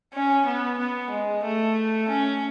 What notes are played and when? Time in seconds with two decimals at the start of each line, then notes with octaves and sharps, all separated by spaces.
0.14 C#4
0.46 B3
0.78 B3
1.10 G#3
1.43 A3
2.09 C#4